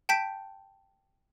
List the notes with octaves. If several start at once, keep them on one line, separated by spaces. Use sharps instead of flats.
G5 A5 G6 B6 D7